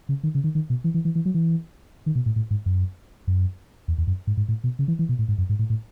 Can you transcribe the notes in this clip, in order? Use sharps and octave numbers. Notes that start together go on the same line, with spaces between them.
C#3
D#3
C#3
D#3
D#3
B2
E3
E3
E3
E3
F#3
E3
D#3
B2
A2
A2
G#2
F#2
F#2
E2
E2
F#2
G#2
G#2
A2
B2
C#3
E3
E3
B2
A2
G#2
F#2
G#2
A2
A2